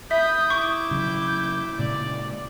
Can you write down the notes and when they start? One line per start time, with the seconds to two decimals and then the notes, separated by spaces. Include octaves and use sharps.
0.11 E5 B5 D#6 G6
0.50 E4 C#6 D6
0.91 C#3 F#3 G6
1.79 A#2 C#3 G#3 D5